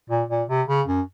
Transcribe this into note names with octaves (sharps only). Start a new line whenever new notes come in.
A#2
A#2
C3
C#3
F#2